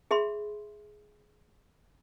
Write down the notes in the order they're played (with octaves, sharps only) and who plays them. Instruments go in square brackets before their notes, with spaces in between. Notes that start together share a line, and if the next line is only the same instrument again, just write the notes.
[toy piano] G#4 E5 B5 C6